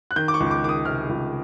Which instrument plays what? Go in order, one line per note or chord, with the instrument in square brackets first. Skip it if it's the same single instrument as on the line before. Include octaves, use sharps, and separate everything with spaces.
[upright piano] F#6
D#3 G6
D6
C#6
C#2
D6
D#3 D6
D#6
C3 F6
C#2